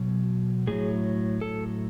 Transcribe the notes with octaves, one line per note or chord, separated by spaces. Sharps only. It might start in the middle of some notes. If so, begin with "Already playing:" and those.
Already playing: B2 F#3
A2 F#3 G#4
A4